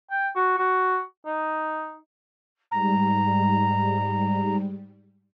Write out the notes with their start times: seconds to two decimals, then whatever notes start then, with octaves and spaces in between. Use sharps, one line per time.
0.10 G5
0.36 F#4
0.58 F#4
1.26 D#4
2.71 G#2 G3 A#5